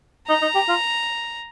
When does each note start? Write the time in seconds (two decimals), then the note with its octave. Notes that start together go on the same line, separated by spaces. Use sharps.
0.29 D#4 A#5
0.42 D#4
0.55 G4
0.69 F4